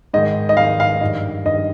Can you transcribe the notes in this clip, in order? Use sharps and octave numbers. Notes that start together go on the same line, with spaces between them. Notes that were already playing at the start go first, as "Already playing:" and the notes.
G#2 D#3 D#5
D#5
G#2 D#3 F5
F5
G2 D#3 D#5
G2 D#3 D#5